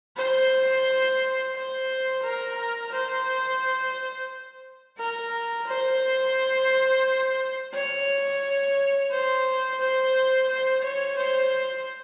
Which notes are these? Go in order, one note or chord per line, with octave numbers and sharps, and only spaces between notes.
C5
C5
A#4
C5
A#4
C5
C#5
C5
C5
C5
C#5
C5